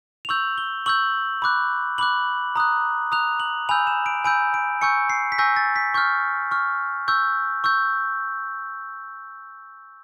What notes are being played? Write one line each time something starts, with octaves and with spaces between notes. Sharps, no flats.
F7
C#6 E6 G6 F#7
G7
C#6 E6 G6 F#7
B5 D6 F#6
B5 D6 F#6 F#7
A#5 D#6 F#6
A#5 D#6 F#6 F7
F#7
G#5 B5 E6 G6 F7
E7
D7
G#5 B5 E6 G6 D7
D7
G#5 C#6 E6 G6 C#7
C7
B6
G#5 C#6 E6 G6 A#6
A6
B6
C#6 F6 G6
C#6 F6
C#6 E6 G6
C#6 E6 G6